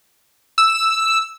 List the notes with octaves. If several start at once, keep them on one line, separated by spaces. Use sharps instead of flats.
E6